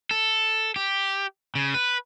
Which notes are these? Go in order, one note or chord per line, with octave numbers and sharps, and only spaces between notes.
A4
G4
C#3
B4